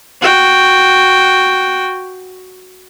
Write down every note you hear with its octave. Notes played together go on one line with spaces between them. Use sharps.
F#4 G5